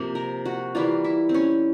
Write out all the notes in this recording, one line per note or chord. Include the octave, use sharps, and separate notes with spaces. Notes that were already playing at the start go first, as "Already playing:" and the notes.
Already playing: C3 F3 A#3
A#4
F#4
E3 G3 A#3 F4
E4
C4
C#4